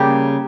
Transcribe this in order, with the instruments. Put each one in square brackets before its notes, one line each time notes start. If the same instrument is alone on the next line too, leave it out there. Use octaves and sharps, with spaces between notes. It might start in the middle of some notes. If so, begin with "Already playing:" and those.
Already playing: [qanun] C#3 G3 A#3 G4